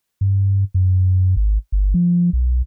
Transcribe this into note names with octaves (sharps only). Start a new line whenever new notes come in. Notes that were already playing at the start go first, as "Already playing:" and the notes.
G2
F#2
G#1
G1
F3
B1